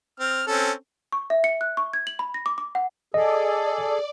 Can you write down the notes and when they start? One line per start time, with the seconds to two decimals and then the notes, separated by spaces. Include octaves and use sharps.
0.20 C4 F6
0.48 C4 C#4 A4
1.12 C#6
1.30 E5
1.44 C#7
1.61 F#6
1.77 C#6
1.93 G#6
2.07 F#7
2.19 B5
2.34 A#6
2.46 D6
2.58 D6
2.75 F#5
3.14 G#4 A4 D5 D#5